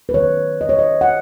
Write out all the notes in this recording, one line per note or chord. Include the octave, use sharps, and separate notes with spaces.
B4
D#3 F#3 A3 C#5
D#5
C#5
D#5
F#5